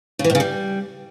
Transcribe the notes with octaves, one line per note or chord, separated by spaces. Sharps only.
C#3
E3
A2
C#3
G3